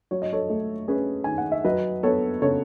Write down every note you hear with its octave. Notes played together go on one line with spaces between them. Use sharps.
F#3 C#5
D#5
A4 C#5
A3
C#4 G#4 B4
D#3 G#5
F#5
E5
F#3 B4 D#5
B3 A4 C#5
C#3 A4 C#5